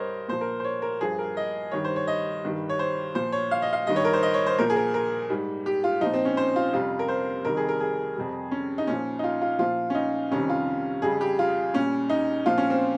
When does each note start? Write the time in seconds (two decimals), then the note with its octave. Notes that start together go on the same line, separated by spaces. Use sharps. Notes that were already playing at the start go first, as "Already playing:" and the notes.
Already playing: G2 G3 A#4 C5 C#5 D#5
0.28 A#2 F3 C5
0.41 A#4
0.60 C5
0.64 C#5
0.82 A#4
1.01 G2 F3 G#4
1.19 A#4
1.37 D#5
1.72 G2 D#3 G3 C#5
1.85 C5
1.96 C#5
2.07 D#5
2.44 G2 D#3 G3
2.70 C#5
2.79 C5
3.15 A#2 F3 C5
3.32 C#5
3.51 F5
3.62 D#5
3.73 F5
3.87 G2 D#3 G3 D#5
3.96 C#5
4.05 A#4
4.13 C5
4.23 D#5
4.34 C#5
4.46 C5
4.59 A#2 F3 A#4
4.70 G#4
4.76 A#4
4.94 A#4
5.30 G#2 G3
5.66 G4
5.84 F4
6.01 A#2 F3 D#4
6.14 C4
6.25 C#4
6.37 C5
6.56 F4
6.73 F2 C3 G3 F4
6.99 A#4
7.08 C5
7.45 F2 C3 D#3 G3 A#4
7.57 G#4
7.69 A#4
7.80 G#4
8.16 F2 C3 G3
8.51 C#4
8.78 D#4
8.87 A#2 F3 C#4
9.19 D#4
9.24 F4
9.42 F4
9.59 A#2 F3 F4
9.90 C#4
9.95 D#4
10.31 F2 C3 D#3 G3 C#4
10.49 F4
11.02 F2 C#3 G3 G#4
11.21 G4
11.39 F4
11.74 A#2 G3 C#4
12.10 D#4
12.46 A#2 F3 F4
12.58 C#4
12.70 C4